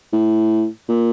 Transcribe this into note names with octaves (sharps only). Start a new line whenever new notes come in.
A2
A#2